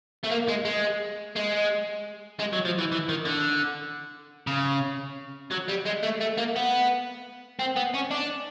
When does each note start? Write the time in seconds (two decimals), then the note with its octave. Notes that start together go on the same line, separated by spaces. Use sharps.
0.24 A3
0.31 A#3
0.49 G#3
0.65 G#3
1.36 G#3
2.39 G#3
2.53 F#3
2.65 F3
2.79 E3
2.92 E3
3.09 D#3
3.25 D3
4.47 C#3
5.51 F#3
5.69 G3
5.86 G#3
6.03 A3
6.21 A3
6.38 A#3
6.56 B3
7.59 C4
7.76 B3
7.95 C#4
8.11 D4